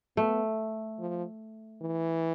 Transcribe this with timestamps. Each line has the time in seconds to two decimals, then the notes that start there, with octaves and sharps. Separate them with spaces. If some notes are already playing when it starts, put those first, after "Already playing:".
0.17 A3 B3
0.99 F3
1.81 E3